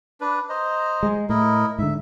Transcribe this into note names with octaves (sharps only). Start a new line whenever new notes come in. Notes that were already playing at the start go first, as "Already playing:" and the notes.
D4 B4
C5 D#5 A#5
G#3
A2 E4 A#4 D#5
G#2 D3 E5